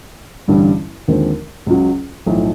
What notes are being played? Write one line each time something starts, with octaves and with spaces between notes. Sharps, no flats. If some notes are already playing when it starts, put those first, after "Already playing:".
A1 G2 D3 G3
D#2 D3 F3 G#3 C4
C#2 C#3 F#3
B1 A2 F3